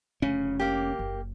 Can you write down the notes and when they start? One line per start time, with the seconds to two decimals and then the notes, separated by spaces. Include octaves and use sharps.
0.22 F1 C#3 C#4
0.59 A#3 G4
0.99 F#1